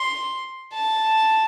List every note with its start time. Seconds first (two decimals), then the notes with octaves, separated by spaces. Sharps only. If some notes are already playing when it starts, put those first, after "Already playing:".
Already playing: C6
0.74 A5